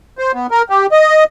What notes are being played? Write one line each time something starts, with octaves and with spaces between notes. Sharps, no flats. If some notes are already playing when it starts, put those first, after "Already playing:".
C5
B3
A#4
G4
D#5